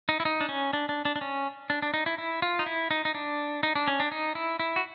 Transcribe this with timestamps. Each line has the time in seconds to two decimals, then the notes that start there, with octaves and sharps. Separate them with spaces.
0.09 D#4
0.20 E4
0.25 D#4
0.41 D4
0.49 C#4
0.73 D4
0.89 D4
1.05 D4
1.16 D4
1.21 C#4
1.70 D4
1.82 D4
1.94 D#4
2.06 E4
2.18 E4
2.42 F4
2.59 D#4
2.66 E4
2.91 D#4
3.05 D#4
3.15 D4
3.63 D#4
3.75 D4
3.88 C#4
4.00 D4
4.12 D#4
4.35 E4
4.60 E4
4.76 F#4